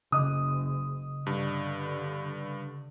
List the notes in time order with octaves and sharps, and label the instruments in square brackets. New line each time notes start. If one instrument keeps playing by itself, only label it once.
[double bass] F#1 [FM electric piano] C#3 [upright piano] D#5 D#6
[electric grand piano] G2 [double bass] D3